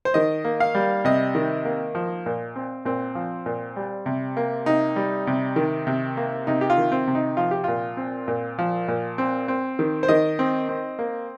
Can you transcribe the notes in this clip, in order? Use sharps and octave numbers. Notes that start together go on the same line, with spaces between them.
C5
D#3 D#5
A#3
F5
G3
C3 D#5
D#3
A#3
F3
A#2
C4
A#2 C4
F3
A#2
G3
C3
A#3
C3 D#4
G3
C3
D#3
C3
A#3
C3 D#4
G4
F4
D#3
C4
C3
D#4
F3 F4
G4
A#2 F4
C4
A#2
F3
A#2
C4
C4
D#3
C5
D#3 D#5
C4
C4
A#3